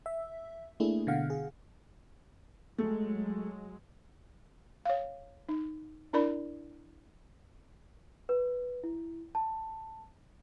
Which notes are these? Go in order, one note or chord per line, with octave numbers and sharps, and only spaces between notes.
E5
A3 A#3 D4 E4 G#4
B2 D3 F5 F#5
G#4
F#3 G#3 A3
C#5 F5
D#4
D4 E4 A#4 D5 B5
B4
E4
A5